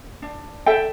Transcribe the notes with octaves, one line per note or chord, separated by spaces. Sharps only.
D4
A4 E5 G5